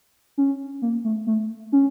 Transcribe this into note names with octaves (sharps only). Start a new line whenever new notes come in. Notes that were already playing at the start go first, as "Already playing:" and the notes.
C#4
A#3
A3
A3
C#4